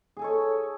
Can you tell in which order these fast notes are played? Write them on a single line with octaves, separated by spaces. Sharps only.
G#4 G#5 A4 C#5